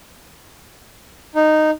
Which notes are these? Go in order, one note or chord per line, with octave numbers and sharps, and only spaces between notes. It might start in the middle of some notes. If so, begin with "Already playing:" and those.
D#4